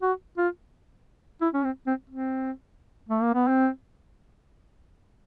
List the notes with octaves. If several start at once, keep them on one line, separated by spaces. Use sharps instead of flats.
F#4
F4
E4
C#4
C4
C4
C4
A3
A#3
B3
C4